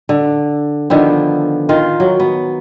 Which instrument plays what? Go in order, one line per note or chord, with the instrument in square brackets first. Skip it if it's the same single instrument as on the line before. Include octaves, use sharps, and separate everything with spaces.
[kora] D3
D3 D#3 F3 B3
D#3 F4 A#4
F#3
B3